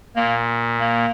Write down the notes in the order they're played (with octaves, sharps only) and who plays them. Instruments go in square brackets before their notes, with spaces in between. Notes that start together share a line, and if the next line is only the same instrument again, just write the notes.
[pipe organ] A#2 [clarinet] A#3
[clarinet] A#3